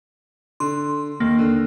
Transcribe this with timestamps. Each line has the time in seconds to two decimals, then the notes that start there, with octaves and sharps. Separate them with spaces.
0.60 D3 C6
1.20 D#2 A#3
1.39 D3